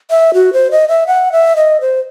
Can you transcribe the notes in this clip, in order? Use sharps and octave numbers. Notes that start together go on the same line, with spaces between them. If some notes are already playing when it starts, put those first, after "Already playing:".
E5
F#4
C5
D#5
E5
F#5
E5
D#5
C5